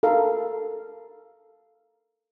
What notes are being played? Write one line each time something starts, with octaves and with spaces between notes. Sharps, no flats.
A4 A#4 F5